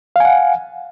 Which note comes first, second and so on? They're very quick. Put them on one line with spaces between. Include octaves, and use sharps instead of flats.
F5 G#5 F#5